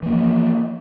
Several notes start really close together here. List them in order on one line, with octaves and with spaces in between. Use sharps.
E3 A#3 F3